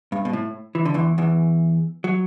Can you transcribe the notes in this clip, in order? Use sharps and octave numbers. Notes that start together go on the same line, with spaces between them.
G2
B2
A2
E3
D3
E2 E3
E2 E3
F#3